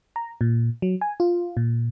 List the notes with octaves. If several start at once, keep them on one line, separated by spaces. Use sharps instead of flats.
A#5
A#2
F#3
G#5
F4
A#2